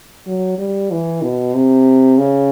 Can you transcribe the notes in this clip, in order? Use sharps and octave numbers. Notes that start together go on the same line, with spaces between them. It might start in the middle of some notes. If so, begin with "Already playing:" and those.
F#3
G3
E3
B2
C3
C#3